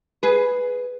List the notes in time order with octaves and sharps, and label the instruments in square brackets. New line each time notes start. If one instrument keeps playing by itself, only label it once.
[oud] G#4 B4